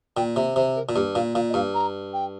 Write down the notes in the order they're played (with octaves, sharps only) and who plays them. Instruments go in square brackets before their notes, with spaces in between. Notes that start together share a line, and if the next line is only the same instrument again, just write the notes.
[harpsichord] A#2 [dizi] G5
[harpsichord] C3
[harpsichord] C3 [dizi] C5
[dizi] A#4
[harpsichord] A#2
[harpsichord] G2 [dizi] G4
[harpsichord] A#2 [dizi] F5
[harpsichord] A#2 [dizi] F5
[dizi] D#5
[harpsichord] G2 [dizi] F5
[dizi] A#5
G5